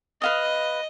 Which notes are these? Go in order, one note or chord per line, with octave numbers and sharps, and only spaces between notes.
B4 D#5 F5 D#6